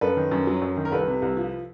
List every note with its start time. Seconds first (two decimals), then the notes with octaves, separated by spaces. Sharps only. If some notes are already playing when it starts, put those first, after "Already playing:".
0.01 F#2 A4 B4
0.17 D#3
0.32 F#2
0.47 F#3
0.62 F#2
0.77 D#3
0.85 A#4
0.92 C2 A4 B4
1.08 C3
1.22 C2
1.37 F3